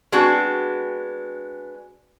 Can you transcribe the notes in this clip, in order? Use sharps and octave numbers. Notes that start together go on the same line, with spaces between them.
G#3 B3 C4 D4 F#4